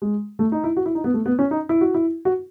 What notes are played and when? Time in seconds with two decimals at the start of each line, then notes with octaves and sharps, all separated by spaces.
0.02 G#3
0.39 A3
0.52 D#4
0.64 E4
0.77 F#4
0.86 E4
0.95 D#4
1.04 B3
1.14 A3
1.26 B3
1.39 C#4
1.51 D#4
1.69 E4
1.81 F#4
1.94 E4
2.25 F#4